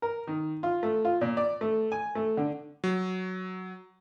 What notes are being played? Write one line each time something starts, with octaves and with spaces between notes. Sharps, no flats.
A#4
D#3
F4
A3
F4
A#2
D5
A3
G#5
A3
D3
F#3